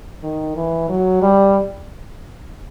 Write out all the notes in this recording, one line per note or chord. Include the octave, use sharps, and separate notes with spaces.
D#3
E3
F#3
G3